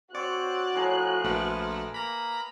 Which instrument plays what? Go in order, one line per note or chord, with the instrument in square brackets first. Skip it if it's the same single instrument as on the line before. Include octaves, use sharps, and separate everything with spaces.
[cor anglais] C4 [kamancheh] F#4 F#6 [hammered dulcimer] C#5 [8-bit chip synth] D5
[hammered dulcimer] A2 G#4 A#5 [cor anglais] F3
[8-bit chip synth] A#1 A3 [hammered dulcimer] A#4 B4
[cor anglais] A#3 [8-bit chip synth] A#5 B5